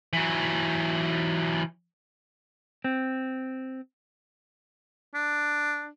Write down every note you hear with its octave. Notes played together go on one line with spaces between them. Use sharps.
E3 F#3
C4
D4